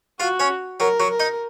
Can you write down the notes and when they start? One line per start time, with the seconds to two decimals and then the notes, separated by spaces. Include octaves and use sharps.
0.20 F4 F#4 F5
0.40 C#4 C#5
0.80 F#3 F#4 A#4
1.00 F#3 F#4
1.10 A#4
1.20 D#4 D#5